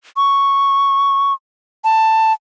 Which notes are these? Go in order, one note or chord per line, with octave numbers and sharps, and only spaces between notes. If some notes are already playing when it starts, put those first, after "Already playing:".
C#6
A5